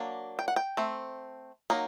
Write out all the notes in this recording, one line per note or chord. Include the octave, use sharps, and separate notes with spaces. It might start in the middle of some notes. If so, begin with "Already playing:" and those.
Already playing: F#3 A#3 D4
G5
F#5
G5
A3 C4
F#3 A#3 D#4